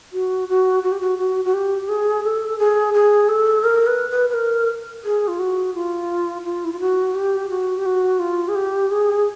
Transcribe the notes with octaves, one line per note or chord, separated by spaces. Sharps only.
F#4
F#4
F#4
G4
F#4
F#4
F#4
G4
G#4
A4
G#4
G#4
A4
A#4
B4
B4
B4
A#4
G#4
F4
F#4
F4
F4
E4
F4
F#4
G4
F#4
G4
F#4
F4
G#4
G4
G#4